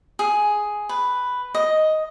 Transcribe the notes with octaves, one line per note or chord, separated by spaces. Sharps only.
G#4
B4
D#5